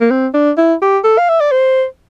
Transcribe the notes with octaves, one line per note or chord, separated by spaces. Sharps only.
A#3
C4
D4
E4
G4
A4
F5
E5
D5
C5